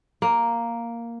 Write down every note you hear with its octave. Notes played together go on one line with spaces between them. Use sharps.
A#3